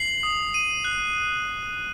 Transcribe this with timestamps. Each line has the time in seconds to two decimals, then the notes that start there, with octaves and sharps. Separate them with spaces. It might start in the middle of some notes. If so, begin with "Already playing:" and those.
Already playing: C7 F#7
0.23 D#6
0.54 D#7
0.84 F#6